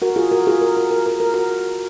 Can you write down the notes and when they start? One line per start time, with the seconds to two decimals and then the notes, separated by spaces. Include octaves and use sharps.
0.02 F#4 A#4
0.16 F4 G#4
0.32 F#4 A#4
0.47 F4 G#4
0.61 A#4
0.77 A#4
0.91 A#4
1.06 A#4
1.20 A#4
1.34 F#4 A#4